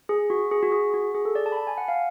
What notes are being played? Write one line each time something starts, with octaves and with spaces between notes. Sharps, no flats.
G#4
F#4
G#4
F#4
G#4
F#4
G#4
A4
D5
A5
B5
A5
G#5
F#5
F5